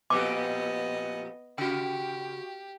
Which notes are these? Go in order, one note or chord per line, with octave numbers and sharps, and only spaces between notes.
F2 A#2 B3 G4 D#5 G#5 D6
C#3 F#4 G4 G5